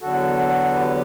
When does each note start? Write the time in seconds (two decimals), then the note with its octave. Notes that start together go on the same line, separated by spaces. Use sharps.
0.01 E2 D3 F#3 F#4 A4
0.73 G4 B4